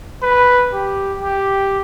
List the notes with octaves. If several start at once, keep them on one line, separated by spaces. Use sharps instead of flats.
B4
G4
G4